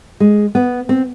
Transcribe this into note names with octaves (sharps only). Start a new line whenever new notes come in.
G#3
B3
C4